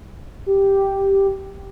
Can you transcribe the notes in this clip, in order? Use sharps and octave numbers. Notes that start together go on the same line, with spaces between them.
G4